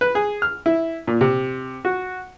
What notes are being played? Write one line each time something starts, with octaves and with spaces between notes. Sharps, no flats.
B4
G#4
F6
E4
A#2
C3
F#4